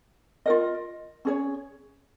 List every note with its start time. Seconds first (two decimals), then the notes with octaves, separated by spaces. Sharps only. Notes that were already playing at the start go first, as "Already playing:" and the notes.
0.46 F4 A#4 D#5
1.25 C#4 G#4 C#5